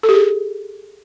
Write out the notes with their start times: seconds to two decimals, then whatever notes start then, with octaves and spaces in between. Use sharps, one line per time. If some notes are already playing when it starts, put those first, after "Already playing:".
0.03 A4
0.09 G4
0.14 G#4